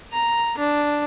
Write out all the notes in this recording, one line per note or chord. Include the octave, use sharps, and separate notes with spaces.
A#5
D4